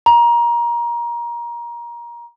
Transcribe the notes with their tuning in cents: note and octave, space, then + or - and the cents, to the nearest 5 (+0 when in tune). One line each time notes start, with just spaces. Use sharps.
A#5 +25